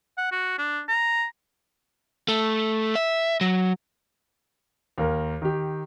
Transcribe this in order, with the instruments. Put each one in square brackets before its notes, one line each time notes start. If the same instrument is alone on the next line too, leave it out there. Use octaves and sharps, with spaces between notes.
[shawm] F#5
F#4
D4
A#5
[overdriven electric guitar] A3
E5
F#3
[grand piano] D#2 A#4
D#3 G4